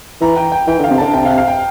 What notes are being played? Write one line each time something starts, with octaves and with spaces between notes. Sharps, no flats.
E3 A#5
G5
G5
E3 G5
D3 F5
C3
D3 A5
C3 G5
F5
F5
G5